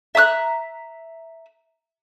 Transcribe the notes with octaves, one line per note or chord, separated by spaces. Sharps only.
E5 A#5 D#6 F#6